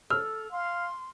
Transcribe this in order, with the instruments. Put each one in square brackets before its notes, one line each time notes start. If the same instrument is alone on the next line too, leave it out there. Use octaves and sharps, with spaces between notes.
[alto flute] A4 [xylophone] E6 [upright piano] F6
[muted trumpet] F5 [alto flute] C6